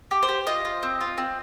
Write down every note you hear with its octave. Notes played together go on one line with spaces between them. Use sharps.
G4
C5
G4
F4 D#5
F4
C4
F4
C4